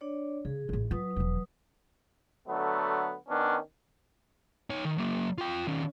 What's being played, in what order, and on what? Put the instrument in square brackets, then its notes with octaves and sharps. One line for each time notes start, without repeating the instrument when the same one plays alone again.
[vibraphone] D4 C#5 D5
[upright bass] C#3 [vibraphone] G#4
[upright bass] A1 A2
[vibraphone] F#3 B4 D#6 [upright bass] F4
[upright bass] E1 F3
[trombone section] D3 F#3 A3 B3
D#3 B3 C#4 D4
[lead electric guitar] D#4 C#5
D#3
F#3 A#3
F4 G5
D#3 C#4